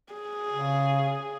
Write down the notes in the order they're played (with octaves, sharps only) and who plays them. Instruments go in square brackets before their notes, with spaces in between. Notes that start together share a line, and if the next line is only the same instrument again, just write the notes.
[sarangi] G#4
[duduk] C#3